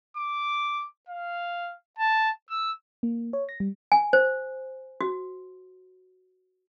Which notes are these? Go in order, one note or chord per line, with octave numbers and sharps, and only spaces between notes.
D6
F5
A5
E6
A#3
C#5
A#6
G3
G#5
C5
F#4